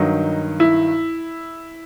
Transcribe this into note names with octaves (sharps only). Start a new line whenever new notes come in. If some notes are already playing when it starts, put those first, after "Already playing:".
Already playing: G2 D#3 F#3 D#4
E4